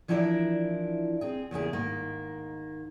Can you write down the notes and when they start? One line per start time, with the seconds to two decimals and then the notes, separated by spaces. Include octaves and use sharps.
0.08 E3 F3 D4 E4 A#4 D5
1.21 C4 G#4
1.51 E2 C#3 A#3 G#4
1.73 G#2 D#3 A#3